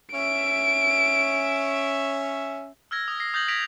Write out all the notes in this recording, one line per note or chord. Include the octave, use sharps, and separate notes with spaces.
C#4 E5 D7
E6 F6 G#6 A#6
D#6
A#6 C7
D#6 G6 A6 A#6 F#7
G#6 A#6 B6 D7 F7